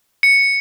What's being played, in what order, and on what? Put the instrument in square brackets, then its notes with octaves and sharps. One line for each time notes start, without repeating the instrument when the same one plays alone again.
[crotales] C#7